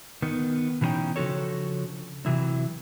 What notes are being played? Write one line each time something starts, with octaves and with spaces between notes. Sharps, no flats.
D#3 B3
B2 E3 F#3 C#4 D#4 G5
C#3 F3 D4 F#4 A4 C#5
C3 E3 F#3 E4